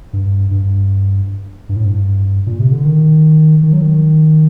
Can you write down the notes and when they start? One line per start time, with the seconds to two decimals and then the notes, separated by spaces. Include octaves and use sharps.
0.13 G2
0.51 G2
1.69 G2
1.76 A2
1.85 G2
2.47 A#2
2.60 C3
2.72 D3
2.85 D#3
3.63 D#3
3.73 F#3
3.82 D#3